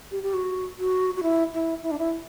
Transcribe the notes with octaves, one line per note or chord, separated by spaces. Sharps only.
G4
G4
F#4
F#4
F#4
E4
E4
E4
D4
E4